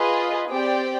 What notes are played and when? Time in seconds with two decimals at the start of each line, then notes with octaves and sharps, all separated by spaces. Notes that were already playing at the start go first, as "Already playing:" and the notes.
Already playing: F4 G#4 B4 D#5
0.50 C4 G4 D5 G5